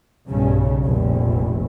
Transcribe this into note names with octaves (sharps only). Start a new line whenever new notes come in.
B1 G2 C#3
F1 A#1